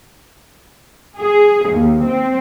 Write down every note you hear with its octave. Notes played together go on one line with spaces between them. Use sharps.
G#4
D#2
C4